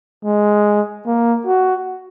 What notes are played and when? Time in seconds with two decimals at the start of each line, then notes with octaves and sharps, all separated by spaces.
0.24 G#3
1.06 A#3
1.46 F#4